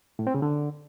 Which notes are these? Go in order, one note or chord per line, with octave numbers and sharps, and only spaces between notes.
A2
C4
C#3
D3